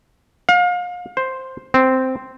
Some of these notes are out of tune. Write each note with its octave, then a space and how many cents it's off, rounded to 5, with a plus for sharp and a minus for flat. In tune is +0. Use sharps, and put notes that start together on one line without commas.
F5 +35
C5 +5
C4 -5